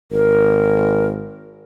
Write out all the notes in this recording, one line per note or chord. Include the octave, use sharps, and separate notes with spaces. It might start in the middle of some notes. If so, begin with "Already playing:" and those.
G#1 A#4